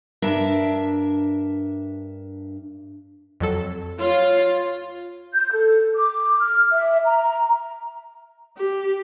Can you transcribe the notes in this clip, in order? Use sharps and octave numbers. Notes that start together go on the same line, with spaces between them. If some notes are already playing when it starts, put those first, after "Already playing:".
G2 D4 A#4 E5
F2 F#3 A4
F4 C#5
G6
A4
D6
F6
E5
A#5
G4